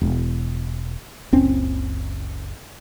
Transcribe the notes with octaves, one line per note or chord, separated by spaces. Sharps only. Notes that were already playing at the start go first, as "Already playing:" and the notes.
E1
F#1 C#2 C4 C#4